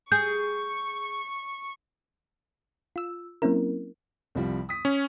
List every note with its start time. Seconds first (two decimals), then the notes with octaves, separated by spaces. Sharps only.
0.12 G#4 C#6 G6
2.96 F4 E6
3.42 F#3 A#3 C4 C#4 E4 A#4
4.35 C2 F3 G3
4.69 D#6 B6
4.85 C#4